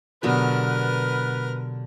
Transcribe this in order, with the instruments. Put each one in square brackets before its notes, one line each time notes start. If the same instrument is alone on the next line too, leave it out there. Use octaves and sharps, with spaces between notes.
[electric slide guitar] B2 G4 [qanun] D3 F#3 B3 [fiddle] A#4 F6 [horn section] B4